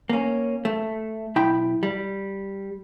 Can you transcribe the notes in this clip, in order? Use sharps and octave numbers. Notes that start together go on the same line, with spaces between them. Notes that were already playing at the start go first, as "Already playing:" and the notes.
A#3 C#4
A3
B1 E4 G5 B5
G3